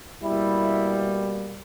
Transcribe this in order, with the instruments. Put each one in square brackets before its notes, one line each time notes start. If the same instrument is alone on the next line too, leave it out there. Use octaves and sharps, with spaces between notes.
[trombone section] B2 G3 A#3 E4